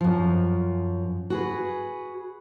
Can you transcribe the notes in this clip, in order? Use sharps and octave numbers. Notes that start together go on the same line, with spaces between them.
F#2 F3
F#4 G#4 B4